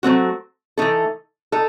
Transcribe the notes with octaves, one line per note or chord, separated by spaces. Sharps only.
F#3 A3 C4 F#4
E3 A3 D#4 A4
D#4 A4